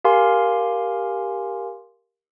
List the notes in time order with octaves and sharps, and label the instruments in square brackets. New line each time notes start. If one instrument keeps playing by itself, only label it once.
[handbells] G4 A#4 F5 G#5 C6